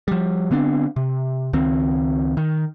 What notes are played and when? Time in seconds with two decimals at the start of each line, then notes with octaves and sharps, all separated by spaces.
0.08 F3 G3
0.51 D3 B3 C4 D4
0.96 C3
1.53 C#2 D#3 C4
2.37 D#3